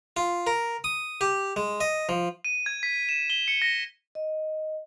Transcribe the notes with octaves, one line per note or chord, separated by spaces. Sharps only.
F4
A#4
D#6
G4
G#3
D#5
F3
D#7
G#6
B6
E7
G7
C#7
A#6
D#5